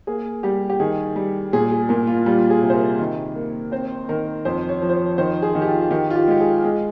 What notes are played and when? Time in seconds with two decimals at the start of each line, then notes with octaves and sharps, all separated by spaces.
0.07 A#3 G#4
0.43 G3 G4
0.70 G4
0.80 D#3 G#4
1.16 G3
1.53 A#2 G#4
1.72 G#4
1.89 A#2 A#4
2.07 F4
2.26 G3 F4
2.50 G#4
2.62 C3
2.70 C5
2.75 A#4
2.99 D#3
3.35 A#3
3.72 C4 C5
4.09 D#3 A#4
4.45 F2 C5
4.69 C#5
4.82 F3
4.90 C5
4.94 C#5
5.18 D#3 C5
5.42 G#4
5.55 D#3
5.62 G4
5.67 F4
5.91 D#3 G4
6.10 F4
6.16 G4
6.28 G#3 G4
6.40 G#4
6.64 G#3